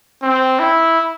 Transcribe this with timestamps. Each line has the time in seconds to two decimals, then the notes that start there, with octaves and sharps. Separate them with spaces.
0.23 C4
0.60 E4